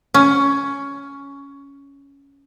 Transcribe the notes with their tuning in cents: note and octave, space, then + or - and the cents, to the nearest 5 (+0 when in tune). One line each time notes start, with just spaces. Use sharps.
C#4 +10